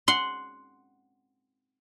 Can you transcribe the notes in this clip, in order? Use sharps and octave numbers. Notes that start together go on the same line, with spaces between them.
F#5 C6